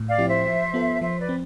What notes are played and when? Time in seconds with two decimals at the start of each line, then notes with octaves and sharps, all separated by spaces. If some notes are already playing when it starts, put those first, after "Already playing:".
Already playing: A2
0.09 D5 F5
0.18 F3 C4 E4 G4
0.28 C5 E5
0.46 F3
0.74 B3 F4 A4
1.01 F3 C5 E5
1.19 B4 D5
1.29 C4